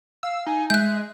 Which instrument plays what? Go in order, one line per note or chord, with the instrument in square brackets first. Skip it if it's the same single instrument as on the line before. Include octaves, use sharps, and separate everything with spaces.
[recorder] F5 [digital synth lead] E6
[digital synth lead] D#4 [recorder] G#5
[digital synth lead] G#3 [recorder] E5 [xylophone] F#6 G6